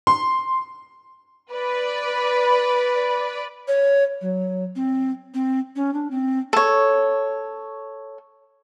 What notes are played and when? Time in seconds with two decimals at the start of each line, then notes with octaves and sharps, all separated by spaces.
0.07 C6
1.52 B4 D5 B5
3.68 C#5
4.21 F#3
4.76 C4
5.34 C4
5.76 C#4
5.94 D4
6.11 C4
6.53 A4 C#5